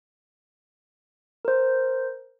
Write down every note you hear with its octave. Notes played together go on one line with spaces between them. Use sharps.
A#4 C5